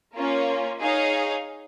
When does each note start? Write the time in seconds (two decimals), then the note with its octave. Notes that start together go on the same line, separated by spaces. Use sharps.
0.16 A#3 C#4 F4
0.80 D#4 G#4 C#5 F5